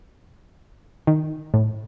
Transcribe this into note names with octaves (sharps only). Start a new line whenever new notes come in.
D#3
A2